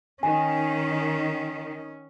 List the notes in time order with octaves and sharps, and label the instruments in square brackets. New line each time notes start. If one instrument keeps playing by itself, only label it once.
[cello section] D#3 [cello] C#4 [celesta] G#5